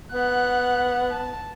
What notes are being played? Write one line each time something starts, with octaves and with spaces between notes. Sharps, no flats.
B3 F#5 F#6
A5